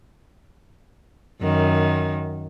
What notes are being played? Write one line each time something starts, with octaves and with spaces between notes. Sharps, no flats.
F#2 D#3